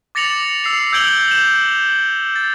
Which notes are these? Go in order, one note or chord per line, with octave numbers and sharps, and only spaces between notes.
D6 A6 A#6 C#7 F7 F#7
E6 C7 F7
E6 G6 G#6 D7 F#7 G7
E7
A6